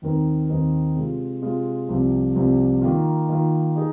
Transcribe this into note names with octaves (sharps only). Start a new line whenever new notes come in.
D#2 D#3 C4 D#4 A#4
D#2 D#3 C4 D#4 A#4
C3 G#3 F4
C3 G#3 F4
C2 C3 F3
C2 C3 F3
D#3 A#3 F4
D#3 A#3 F4
D#4 G#4 D#5